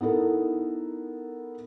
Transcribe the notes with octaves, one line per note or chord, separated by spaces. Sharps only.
B3 D#4 E4 A4 A#4